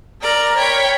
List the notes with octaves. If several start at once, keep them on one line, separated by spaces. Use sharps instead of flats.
A#4 D5 A#5
C#5 G5 B5